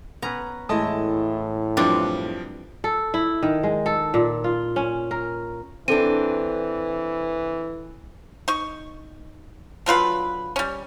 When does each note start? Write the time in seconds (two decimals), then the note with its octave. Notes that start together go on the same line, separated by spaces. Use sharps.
0.22 B3 C#4 B4 A#5
0.69 A2 E3 G#3 A3 D#5 A5 D#6
1.77 F#2 F3 G3 C4 D4 B4
2.84 A4
3.14 E4
3.43 D#3
3.63 G#3
3.86 A4
4.14 A#2
4.44 F4
4.76 C#4
5.11 A#4
5.88 E3 C4 D4 A4 D#7
8.48 D#4 C#6
9.86 D3 F#3 F4 B4
10.56 G3 C#4